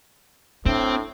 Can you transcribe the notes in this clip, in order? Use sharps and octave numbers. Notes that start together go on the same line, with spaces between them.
A2 C4 D4